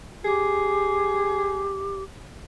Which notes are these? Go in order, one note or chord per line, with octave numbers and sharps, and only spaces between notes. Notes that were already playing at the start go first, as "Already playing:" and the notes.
G4 G#4